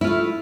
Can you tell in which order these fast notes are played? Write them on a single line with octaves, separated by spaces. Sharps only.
E4 F4 A3